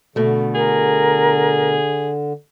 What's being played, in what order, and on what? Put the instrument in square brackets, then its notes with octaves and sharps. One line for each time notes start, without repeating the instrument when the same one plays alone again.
[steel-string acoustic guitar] B2 A3 [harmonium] D3
[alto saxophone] G#4 [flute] A#4